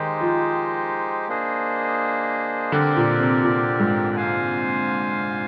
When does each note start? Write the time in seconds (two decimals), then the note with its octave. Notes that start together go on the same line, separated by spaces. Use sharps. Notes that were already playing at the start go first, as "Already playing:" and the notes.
Already playing: D#3 G#3 D#4 G4 C5 D#5
0.21 F3
1.29 A#3 D4 G#4 C5 D#5
2.72 D3 C4 G4 A#4 D5
2.97 A#2
3.20 C3
3.44 A#2
3.80 G#2
4.16 F4 C5 F5 G#5